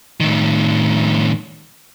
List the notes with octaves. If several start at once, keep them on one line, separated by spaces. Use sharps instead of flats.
A2 D#3